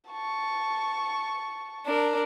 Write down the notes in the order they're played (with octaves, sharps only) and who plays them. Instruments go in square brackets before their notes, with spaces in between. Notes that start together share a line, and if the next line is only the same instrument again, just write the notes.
[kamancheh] A5 C#6
[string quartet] D4 A#4